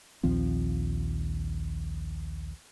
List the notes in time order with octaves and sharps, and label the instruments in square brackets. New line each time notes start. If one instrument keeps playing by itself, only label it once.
[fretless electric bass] A#1 D#2 F3 C4